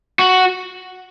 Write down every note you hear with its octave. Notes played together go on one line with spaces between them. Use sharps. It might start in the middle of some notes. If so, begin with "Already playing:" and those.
F#4